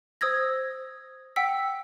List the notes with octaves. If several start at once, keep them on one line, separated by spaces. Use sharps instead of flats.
C5 D#6 E6 G#6 A#6
F#5 G5 E6 B6